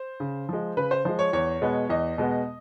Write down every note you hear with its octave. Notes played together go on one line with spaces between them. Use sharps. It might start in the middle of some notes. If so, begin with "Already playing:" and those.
Already playing: C5
C#3
F3 G#3
C#3 B4
C5
F3 G#3 C5
C#5
E2 C#5
B2 G#3 B3
E2 D#5
B2 G#3 B3